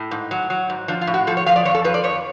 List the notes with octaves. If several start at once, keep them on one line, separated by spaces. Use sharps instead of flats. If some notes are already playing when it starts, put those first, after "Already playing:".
Already playing: A2
G#2
F#3
F#3
G#2
F3 D4
F4
A2
F#4
F3 A4
C#5
F3 F5
D5
F2 C#5
A4
F3 B4
D5
F2 C#5